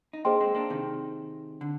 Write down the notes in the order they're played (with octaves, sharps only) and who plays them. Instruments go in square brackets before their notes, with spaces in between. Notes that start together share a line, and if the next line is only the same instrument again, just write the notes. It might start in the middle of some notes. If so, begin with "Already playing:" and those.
[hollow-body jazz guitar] D#4
[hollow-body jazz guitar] A#3 D4 [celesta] G#4 C5 D#5 G5 C6
[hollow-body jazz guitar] G#3 C4
A#3 D4
C3 D#3
D3